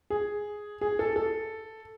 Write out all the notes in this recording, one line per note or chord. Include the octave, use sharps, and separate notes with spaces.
G#4
G#4
A4
A4